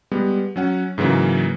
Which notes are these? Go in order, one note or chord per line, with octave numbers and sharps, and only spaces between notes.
G3 G#3 B3
F#3 C#4 F#5
G#2 C#3 E3 F#3 A#3